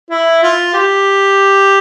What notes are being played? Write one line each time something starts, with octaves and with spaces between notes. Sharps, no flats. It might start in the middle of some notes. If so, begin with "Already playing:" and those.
E4
F4
G4